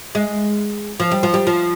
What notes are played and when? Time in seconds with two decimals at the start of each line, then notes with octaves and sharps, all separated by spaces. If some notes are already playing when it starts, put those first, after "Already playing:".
0.15 G#3
1.00 F3
1.11 G3
1.23 F3
1.34 G3
1.47 F3